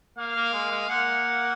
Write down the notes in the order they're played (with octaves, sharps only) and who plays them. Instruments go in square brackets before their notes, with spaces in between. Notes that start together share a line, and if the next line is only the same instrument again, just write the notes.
[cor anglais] A#3 [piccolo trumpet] F5
[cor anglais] A#3
G#3
G#3
[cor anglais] A#3 [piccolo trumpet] F#5